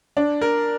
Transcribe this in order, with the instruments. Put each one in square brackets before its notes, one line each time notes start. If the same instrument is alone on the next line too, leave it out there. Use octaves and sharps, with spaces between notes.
[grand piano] D4
A#4